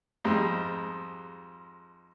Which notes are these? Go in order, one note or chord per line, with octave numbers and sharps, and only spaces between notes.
F2 G#2 G3 G#3